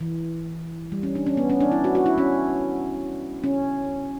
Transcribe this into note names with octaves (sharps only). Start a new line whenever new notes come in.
E3
G3
C#4
D4
C#4
B3
C#4
D4
E4
F#4
F#4
E4
C#4
C#4